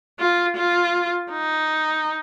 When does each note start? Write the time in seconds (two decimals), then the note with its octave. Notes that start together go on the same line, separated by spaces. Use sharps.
0.19 F4
0.57 F4
1.31 D#4